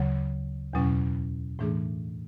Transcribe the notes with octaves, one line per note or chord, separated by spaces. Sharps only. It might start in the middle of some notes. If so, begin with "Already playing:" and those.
Already playing: D2 C#3 F#3
E2 B2 F#3 C#4
A2 E3 A3 D4 G#4